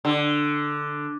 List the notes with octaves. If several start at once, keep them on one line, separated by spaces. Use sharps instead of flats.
D3